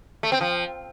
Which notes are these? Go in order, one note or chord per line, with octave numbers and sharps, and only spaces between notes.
A3
C4
F3